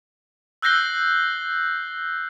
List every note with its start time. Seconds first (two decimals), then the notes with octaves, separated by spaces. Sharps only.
0.62 E6 F#6 G6 A#6 C7 G7